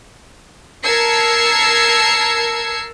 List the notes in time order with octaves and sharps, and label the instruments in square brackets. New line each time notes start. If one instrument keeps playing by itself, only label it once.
[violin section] A#4 A5 E6 G#6 C7 C#7